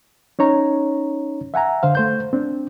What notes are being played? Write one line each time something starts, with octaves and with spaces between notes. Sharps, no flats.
C#4 D#4 C#5 A#5
E5 F#5 G#5 A#5
D3 C5 F5
A3 C5 G6
C4 D4